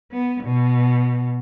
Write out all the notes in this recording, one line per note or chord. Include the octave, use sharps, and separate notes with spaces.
B3
B2